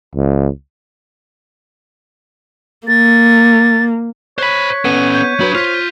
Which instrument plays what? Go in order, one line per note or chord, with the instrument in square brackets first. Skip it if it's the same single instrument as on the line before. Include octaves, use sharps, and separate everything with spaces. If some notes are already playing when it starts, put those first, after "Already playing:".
[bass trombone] C#2
[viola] A#3 [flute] A6
[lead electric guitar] C5 B5 [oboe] C#5 [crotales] F#6 B6
[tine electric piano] B3 [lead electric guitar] C#4 A4 [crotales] D#7
[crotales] G6
[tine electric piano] F#3 B4 [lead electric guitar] D4 B5
[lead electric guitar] F4 [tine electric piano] C5 [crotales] F6 B6